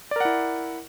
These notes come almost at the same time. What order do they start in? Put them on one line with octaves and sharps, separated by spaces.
D5 A#4 F#5 E4